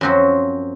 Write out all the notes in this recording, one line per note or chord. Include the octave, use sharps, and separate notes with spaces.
F#2 F3 C4 F#4